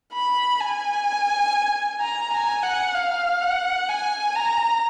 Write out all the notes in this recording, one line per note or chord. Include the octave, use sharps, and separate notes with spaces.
B5
G#5
A#5
G#5
F#5
F5
F#5
G#5
A#5